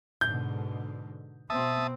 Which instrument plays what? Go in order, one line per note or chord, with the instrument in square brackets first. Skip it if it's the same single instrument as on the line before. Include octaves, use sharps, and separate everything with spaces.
[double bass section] G#2 B2 D3 [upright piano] G6
[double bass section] B2 [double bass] B3 C4 [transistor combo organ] E5 A5 D#6